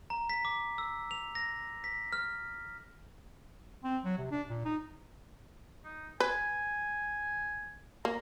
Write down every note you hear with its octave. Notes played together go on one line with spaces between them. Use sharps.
A#5
B6
D6
E6
F7
A#6
B6
F6
C4
F#3
C3
D4
A#2
D#4
D#4
B4 G#5
A#3 A#5